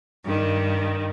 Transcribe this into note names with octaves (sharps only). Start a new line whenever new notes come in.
G2 D#3